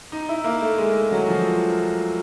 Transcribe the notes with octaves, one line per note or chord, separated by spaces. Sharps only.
D#4
E4
A#3
A3
G#3
F#3
F3